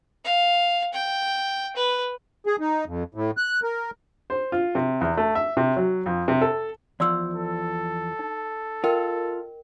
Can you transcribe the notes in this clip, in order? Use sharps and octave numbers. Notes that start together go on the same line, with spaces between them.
F5
G5
B4
G#4
D#4
F2
A2
F#6
A#4
C5
F4
C3
E2
A3
E5
C3
F#3
F2
C3
A4
E2 F3 D5 C6 E6
A4
D#4
F4 A#4 D#5 G5